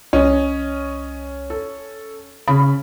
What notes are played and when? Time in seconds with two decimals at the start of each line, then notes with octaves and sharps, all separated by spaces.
0.13 C2 C#4 D#5
1.50 A4
2.48 C#3 C#4 B5